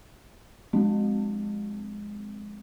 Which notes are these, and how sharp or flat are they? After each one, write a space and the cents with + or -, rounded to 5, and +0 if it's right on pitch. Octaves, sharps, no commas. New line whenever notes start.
F3 +40 G#3 +0 C4 -10